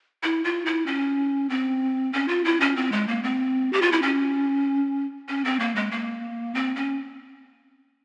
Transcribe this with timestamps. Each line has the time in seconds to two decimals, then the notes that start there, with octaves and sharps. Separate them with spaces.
0.23 E4
0.44 F4
0.66 E4
0.86 C#4
1.49 C4
2.13 C#4
2.28 F4
2.44 E4
2.60 C#4
2.76 C4
2.92 G#3
3.08 A#3
3.23 C4
3.73 G4
3.82 F4
3.92 E4
4.02 C#4
5.28 C#4
5.44 C4
5.59 A#3
5.75 G#3
5.91 A#3
6.54 C4
6.75 C#4